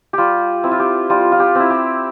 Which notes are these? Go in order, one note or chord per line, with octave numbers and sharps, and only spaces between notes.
G3 F4 G4
C4 E4
F4
G4
G3 F4
F4
G4
C4 E4
G4